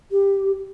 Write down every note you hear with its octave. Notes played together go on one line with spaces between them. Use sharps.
G4